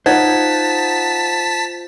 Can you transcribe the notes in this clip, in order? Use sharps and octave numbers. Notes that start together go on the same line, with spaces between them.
D#4 F4 C5 F#5 A5 G#6 B6